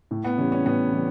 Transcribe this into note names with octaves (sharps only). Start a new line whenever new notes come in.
A2
B3
E3 G3 C#4
C#4
A2 B3
E3 G3